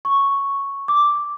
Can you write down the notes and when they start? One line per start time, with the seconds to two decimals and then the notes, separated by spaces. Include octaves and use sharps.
0.05 C#6
0.88 D6